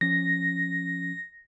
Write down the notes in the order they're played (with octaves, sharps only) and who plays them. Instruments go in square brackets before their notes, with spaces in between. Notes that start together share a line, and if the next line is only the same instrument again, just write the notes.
[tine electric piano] F3 C#4 [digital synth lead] A#6